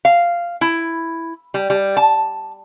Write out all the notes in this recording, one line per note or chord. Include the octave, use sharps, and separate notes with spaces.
F5
E4
G3
G3
A5